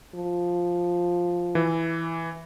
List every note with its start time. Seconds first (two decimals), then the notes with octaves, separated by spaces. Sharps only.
0.14 F3
1.55 E3